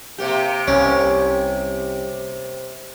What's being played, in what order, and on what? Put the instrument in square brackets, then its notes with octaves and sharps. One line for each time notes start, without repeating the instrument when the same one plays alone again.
[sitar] C3 A#3 G4
[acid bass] C2 [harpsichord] C#4